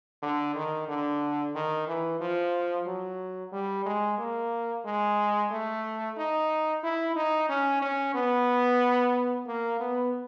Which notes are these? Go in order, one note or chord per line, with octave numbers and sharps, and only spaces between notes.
D3
D#3
D3
D#3
E3
F3
F#3
G3
G#3
A#3
G#3
A3
D#4
E4
D#4
C#4
C#4
B3
A#3
B3